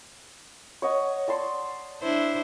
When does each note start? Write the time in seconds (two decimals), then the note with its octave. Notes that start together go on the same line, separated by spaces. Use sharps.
0.82 C#5 D#5 F#5
1.28 D5 A5 C6
2.01 D4 E4 C5